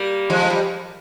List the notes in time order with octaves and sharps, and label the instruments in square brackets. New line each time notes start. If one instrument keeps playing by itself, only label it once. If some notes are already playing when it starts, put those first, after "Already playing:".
Already playing: [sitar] G3 A#3
F3 G#3
G#3
G3